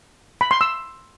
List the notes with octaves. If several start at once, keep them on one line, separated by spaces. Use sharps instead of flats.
B5
C6
E6